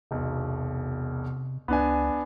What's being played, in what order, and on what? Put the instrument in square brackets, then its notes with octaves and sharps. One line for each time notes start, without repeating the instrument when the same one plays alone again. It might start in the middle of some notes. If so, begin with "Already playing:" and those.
[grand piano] E1 B1 [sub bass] C3
[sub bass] C#2 [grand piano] B3 D4 G#5